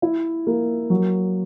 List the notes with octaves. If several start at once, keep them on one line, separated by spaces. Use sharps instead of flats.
E4
A#3
F#3